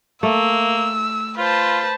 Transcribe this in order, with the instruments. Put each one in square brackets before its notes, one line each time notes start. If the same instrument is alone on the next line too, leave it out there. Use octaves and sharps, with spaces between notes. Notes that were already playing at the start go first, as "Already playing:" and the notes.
[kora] A3 [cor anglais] A#3 [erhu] E6
[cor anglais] F4 [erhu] B4 [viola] C5 A5